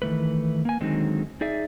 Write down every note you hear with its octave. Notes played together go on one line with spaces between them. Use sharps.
D#3 E3 A3 B4
A#3 G#5
D3 D#3 F#3 G#3 C4 D#4
D#4 G#4 D5 E5